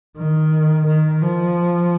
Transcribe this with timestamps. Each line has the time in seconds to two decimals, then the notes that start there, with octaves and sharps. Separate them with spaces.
0.17 D#3
0.87 D#3
1.22 F3